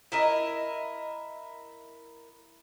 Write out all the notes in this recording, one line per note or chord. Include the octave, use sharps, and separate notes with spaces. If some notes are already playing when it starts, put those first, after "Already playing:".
E4 A#4 D#5